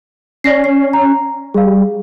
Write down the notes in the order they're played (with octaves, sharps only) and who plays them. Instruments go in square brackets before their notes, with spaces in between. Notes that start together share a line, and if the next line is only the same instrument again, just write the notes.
[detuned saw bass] C#4 [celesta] D5 A#6 C7
[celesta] C7
A#5
[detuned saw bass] G3 [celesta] G#4 F5